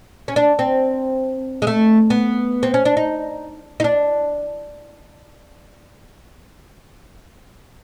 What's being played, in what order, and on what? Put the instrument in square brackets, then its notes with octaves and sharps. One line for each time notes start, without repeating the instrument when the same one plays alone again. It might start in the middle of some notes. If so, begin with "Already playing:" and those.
[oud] C#4
D4
C4
G#3
A3
B3
C4
C#4
D4
D#4
D#4
D4